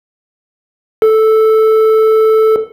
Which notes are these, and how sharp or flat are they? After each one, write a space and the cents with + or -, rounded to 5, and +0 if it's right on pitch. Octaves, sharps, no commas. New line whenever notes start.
A4 -5